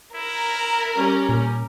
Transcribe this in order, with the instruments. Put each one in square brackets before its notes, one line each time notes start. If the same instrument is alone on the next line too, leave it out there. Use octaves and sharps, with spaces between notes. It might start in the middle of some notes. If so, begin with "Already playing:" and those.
[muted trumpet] E4 [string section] A#4
[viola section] G3 C#4
[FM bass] A#2